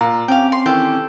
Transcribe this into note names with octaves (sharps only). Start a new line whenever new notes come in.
A#2 F5 A#5
C4 C#4 G4 F5
C6
D#3 E3 C#4 G4 A4